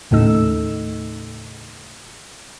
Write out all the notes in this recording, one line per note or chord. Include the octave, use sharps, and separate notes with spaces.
D#2 A2 C#3 A3 D#4 E6